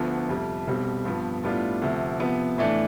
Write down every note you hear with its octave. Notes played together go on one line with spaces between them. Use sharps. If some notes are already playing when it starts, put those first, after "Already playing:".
Already playing: D2 D3 F3 B3
F2 C3 G3
B1 B2 G3 C4
G2 F3 B3
A2 G3 B3 D4 F4
D2 C3 F3
C3 F3 B3
A2 E3 A3 D4